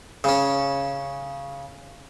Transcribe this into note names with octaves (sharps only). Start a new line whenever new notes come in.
C#3 C#4